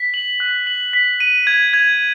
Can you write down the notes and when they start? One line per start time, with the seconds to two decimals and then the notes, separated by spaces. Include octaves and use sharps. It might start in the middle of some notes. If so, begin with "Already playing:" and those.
Already playing: B6
0.14 F#7
0.40 F#6
0.67 F#7
0.93 B6
1.20 D#7
1.47 G#6
1.73 G#6